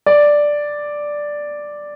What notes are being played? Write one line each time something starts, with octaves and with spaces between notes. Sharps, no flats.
D5